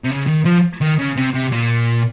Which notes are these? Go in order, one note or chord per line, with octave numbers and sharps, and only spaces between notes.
C3
C#3
D#3
F3
D#3
C#3
C3
C3
A#2